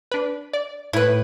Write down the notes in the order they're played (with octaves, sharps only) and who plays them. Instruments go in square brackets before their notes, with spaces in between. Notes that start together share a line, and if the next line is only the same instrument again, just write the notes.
[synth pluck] D4 B4
D5
[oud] A2 [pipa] E4 B4